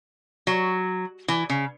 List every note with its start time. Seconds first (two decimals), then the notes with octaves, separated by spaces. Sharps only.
0.47 F#3
1.28 E3
1.50 C#3